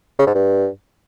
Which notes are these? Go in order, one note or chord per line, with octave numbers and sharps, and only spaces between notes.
C#3
G#2
G2